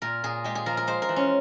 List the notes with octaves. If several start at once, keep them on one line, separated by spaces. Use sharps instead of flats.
A#2 A#4
A#2 G#4
G#3 G4
G#4
F3 A#4
A#4
G#3 C5
A#4
E3
C#4